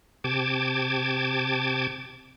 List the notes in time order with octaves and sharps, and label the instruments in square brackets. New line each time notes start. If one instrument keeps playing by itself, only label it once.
[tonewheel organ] C3 G5 A5 D6 G#6